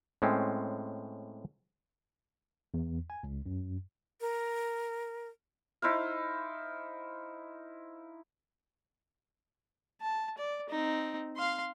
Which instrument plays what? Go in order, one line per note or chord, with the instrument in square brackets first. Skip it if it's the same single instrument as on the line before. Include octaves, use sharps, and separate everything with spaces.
[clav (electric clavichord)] A2 G#3 C4 C#4
[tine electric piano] E2
G#5
C#2
F#2
[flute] A#4
[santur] D#4 E4 C5 F5
[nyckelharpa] A5
D5
C4 D#4
F5 C6